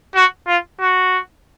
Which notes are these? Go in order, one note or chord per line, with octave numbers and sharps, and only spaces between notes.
F#4
F4
F#4